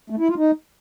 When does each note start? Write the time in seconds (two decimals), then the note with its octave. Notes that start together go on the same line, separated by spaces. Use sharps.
0.10 A3
0.19 E4
0.28 F4
0.37 D#4